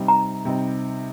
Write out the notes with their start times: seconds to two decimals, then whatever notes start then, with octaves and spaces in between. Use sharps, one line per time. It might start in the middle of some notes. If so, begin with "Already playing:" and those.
Already playing: C3 G3 C4 D#4
0.08 A#5
0.45 C3 G3 C4 D#4